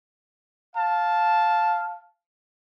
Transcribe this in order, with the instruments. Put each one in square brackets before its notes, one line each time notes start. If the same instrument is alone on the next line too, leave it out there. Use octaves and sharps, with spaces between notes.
[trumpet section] F5 A5